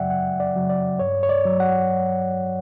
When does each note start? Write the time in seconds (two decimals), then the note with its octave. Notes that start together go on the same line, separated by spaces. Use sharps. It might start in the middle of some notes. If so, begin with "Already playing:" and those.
Already playing: F#2 C#3 F#3 D5 E5 F#5 G5
0.10 F#2 F#5
0.40 D5
0.56 C#3 F#3
0.70 D5
0.99 G2 C#5
1.23 C#5
1.29 D5
1.45 F#3
1.60 F#5